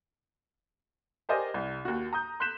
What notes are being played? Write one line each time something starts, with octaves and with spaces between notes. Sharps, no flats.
G4 A#4 C5 D5 D#5 G#5
C2
D#2 F#4
A#5 D#6 G6
C6 F#6 G6 B6 E7